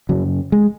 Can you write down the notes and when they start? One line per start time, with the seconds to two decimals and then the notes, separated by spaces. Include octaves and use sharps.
0.09 F#2 C#3 F#3
0.52 G#3